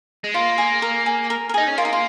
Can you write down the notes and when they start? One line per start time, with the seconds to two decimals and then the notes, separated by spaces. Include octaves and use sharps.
0.24 G#3
0.34 A#3 F4
0.58 G#4
0.82 A#4
1.06 G#4
1.30 A#4
1.49 A#4
1.54 D#4 G#4
1.68 C#4
1.78 A#3 F4
1.85 D#4
1.93 F4